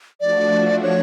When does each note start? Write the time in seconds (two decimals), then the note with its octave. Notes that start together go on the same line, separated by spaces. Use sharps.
0.20 F3 A3 D4 F#4 D5
0.83 C#5